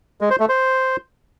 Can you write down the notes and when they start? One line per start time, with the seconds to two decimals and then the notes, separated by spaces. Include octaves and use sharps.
0.21 G#3
0.30 C5
0.40 A3
0.49 C5